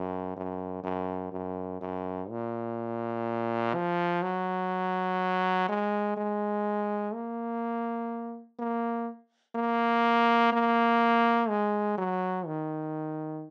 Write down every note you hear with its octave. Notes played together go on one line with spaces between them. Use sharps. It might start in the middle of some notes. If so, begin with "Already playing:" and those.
Already playing: F#2
F#2
F#2
F#2
F#2
A#2
F3
F#3
G#3
G#3
A#3
A#3
A#3
A#3
G#3
F#3
D#3